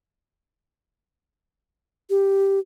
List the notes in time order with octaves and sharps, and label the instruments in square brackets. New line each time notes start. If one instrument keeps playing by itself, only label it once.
[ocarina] G4